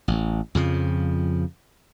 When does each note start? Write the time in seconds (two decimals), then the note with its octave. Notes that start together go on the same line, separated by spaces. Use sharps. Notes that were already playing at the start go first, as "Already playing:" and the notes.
0.08 A1
0.55 F2 C#3 F3